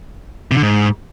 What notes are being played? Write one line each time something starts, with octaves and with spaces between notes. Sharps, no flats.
C3
D3
G#2